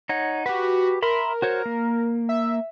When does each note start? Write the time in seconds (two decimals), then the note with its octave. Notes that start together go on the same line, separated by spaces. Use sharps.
0.09 D#4 C#5 F#5
0.46 F#4 G4 B4
1.02 A#4 E5 B5 C6
1.42 F#4 C5 C#5
1.66 A#3
2.29 E5